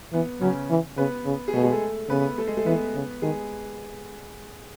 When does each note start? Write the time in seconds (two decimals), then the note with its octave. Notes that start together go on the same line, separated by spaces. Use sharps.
0.13 E3 B3
0.41 C#3 F#3 C#4
0.70 E3
0.97 C#3 B3 B4
1.26 C#3
1.48 G#4
1.53 B2 A3 A4
1.63 G#3 G#4
1.72 A3 A4
2.09 C#3 B3 B4
2.38 A3 A4
2.47 G#3 G#4
2.57 A3 A4
2.66 E3 B3 B4
2.95 C#3
3.22 D#3 G#3 G#4